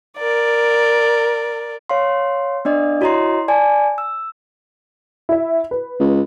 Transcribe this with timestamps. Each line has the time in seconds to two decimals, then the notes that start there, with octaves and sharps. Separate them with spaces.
0.18 A#4 D5
1.89 C#5 F5 C6
2.65 B3 D4 D5 D#5
3.01 E4 F#4 C#5 D#5 A#5 C6
3.48 D5 G#5 A5
3.98 E6
5.29 E4 E5
5.71 B4
6.00 C#2